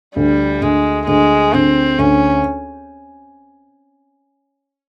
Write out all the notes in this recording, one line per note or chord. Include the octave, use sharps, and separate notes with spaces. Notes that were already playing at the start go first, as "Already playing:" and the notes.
D2 G3
D2 G#3
D2 G#3
D2 C4
D2 C#4